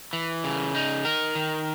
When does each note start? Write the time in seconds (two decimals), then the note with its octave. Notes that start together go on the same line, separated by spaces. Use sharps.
0.13 E3
0.44 C#3
0.75 D#4
1.05 A#4
1.35 D#3